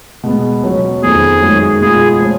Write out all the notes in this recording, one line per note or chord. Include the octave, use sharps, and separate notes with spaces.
B2 G#3 B3
B2 F#3 C#4 F#4
F2 D#3 F#3 B3 F#4 G#4
F#2 D#3 G#3 C#4 F#4
B2 G#3 B3 F4 G#4
F3 G#3 C#4